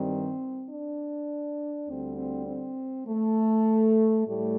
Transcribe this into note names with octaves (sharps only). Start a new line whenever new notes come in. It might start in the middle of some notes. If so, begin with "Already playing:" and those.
Already playing: G2 D#3 G3 C4
D4
D2 D3 G3 C4
C4
C4
A3
A2 G3 A3